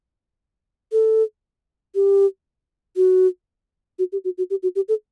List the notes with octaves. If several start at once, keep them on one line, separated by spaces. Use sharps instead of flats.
A4
G4
F#4
F#4
G4
F#4
F#4
G4
F#4
G4
A4